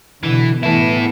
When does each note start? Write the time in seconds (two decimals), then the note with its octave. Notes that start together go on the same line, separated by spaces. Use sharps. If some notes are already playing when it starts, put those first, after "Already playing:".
0.24 B2 D3 E3
0.63 A2 E3 B3 E4 A4